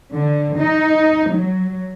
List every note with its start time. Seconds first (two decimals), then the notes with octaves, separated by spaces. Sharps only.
0.11 D3
0.57 D#4
1.32 F#3